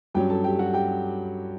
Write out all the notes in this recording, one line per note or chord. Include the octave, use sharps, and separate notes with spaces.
G2 F#3 C#4 G4 G5
A4 A5
G4 G5
F#4 F#5
G4 G5